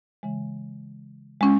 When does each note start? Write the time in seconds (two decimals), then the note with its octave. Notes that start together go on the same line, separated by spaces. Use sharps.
0.23 C#3 E3 G#3
1.41 G#3 C#4